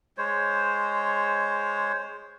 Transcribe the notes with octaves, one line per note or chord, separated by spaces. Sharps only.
G#3 C5 C#5